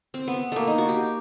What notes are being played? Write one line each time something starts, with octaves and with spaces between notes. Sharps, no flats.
C4
B3
A3 A#3
D#4
F#4
G4